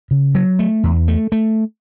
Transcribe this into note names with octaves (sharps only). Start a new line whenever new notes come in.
C#3
F#3
A3
E2
A3
A3